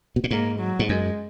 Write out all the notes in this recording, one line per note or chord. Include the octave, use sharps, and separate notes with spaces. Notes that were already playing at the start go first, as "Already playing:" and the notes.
B2
A#2
G#2 A#3
F#3
G#2
F#2 G#3